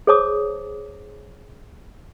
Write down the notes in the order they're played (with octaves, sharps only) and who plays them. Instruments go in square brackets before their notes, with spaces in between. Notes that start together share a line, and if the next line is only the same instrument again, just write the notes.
[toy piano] G#4 C5 C#5 A5 D6 D#6